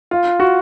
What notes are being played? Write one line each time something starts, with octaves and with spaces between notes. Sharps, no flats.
F4
F#4